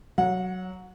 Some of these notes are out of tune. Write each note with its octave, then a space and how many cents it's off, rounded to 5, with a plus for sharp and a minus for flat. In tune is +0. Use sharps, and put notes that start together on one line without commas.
F#3 +5 F#5 -25